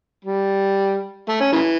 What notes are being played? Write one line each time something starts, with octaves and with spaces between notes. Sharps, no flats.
G3
A3
C#4
C#3 E3